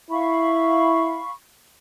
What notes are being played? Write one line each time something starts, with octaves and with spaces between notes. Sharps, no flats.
E4 F5 B5 C#6